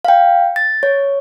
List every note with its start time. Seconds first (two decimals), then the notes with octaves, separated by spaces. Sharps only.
0.05 F5 G5
0.56 A6
0.83 C#5